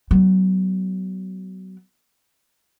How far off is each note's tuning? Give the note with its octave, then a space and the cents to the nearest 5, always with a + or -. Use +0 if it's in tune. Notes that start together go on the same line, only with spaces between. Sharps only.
F#3 +25 B3 +20